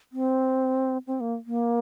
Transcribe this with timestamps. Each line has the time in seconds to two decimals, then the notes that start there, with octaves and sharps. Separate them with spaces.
0.12 C4
1.07 C4
1.20 A#3
1.46 A#3